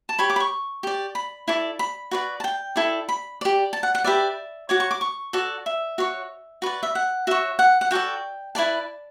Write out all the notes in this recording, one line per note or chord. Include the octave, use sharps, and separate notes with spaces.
A5
G4 C#5 B5
D6
B5
C#6
G4 D5
B5
E4 A4 D5
B5
F#4 B4 D5
A5
G5
E4 A4 D5
B5
G4 D5
A5
F#5
F#5
G4 B4 D5 E5
F#4 C#5 D6
C#6
D6
C#6
F#4 A4 D5
E5
F#4 C#5
F#4 B4 D5
E5
F#5
F#4 C#5 E5
F#5
F#5
F#4 A4 D5 G5
E4 B4 D5 A5